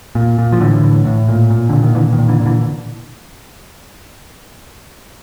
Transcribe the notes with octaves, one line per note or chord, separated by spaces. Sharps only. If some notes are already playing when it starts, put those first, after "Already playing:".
A#2
A#2
F3
A2 D3 E3
A2
A2
A#2
A#2
A#2 D3
D#3
A#2 D3 E3
D#3
A#2
D3 E3
A#2
D3 E3